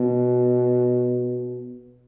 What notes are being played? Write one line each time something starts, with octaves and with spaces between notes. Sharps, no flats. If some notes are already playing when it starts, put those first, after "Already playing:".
Already playing: B2